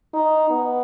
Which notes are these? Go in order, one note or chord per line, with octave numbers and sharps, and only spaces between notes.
D#4
B3